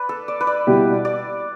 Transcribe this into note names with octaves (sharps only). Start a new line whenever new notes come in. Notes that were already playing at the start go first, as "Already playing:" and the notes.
Already playing: B4 D5
A4
D5
B4
D5
B2 G3 E4 G4
D5